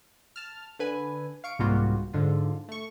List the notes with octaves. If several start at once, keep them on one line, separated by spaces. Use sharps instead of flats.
A5 F6
D3 B4 G#5
F5 C#6 D7
C2 G#2 G3 A#3 F4 F#4
G#2 D3 F4
A3 C#6